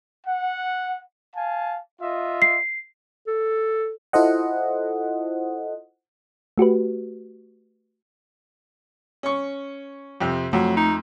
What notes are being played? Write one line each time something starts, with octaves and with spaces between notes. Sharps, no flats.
F#5
F5 G#5 A5
F4 D#5 E5
C7
A4
E4 F4 A4 C5 D#5 F#5
A3 F#4 G4 B4
C#4 C#6
F2 C3
F2 F#3 A3
D#4